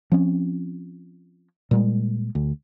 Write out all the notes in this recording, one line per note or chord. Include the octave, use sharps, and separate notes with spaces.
F3 C4 C#4
A#2 G3 G#3
D2